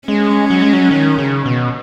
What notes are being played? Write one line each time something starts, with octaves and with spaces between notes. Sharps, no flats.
G#3 C#4
F#3
G#3
F#3
D#3
C#3
B2